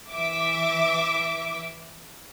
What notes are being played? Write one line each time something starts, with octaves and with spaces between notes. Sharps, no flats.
E3 E5 D6